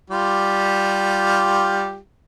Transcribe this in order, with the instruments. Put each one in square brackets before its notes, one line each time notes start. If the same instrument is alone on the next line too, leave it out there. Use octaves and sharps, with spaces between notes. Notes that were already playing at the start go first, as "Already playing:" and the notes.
[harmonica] G3 F4 G4